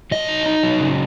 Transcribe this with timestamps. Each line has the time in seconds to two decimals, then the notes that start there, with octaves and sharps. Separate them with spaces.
0.11 F#3 D#5
0.28 D#4
0.46 D#4
0.63 F#3
0.80 C#3